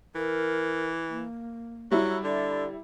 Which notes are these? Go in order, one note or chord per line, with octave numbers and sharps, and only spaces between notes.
E3 A#4
A#3
F#3 G3 E4
D3 D5